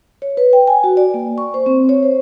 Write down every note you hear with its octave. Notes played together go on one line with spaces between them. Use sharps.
C#5
B4
G5
G#5
F#4
D5
A#3
C#6
C5
C4
C#5
C5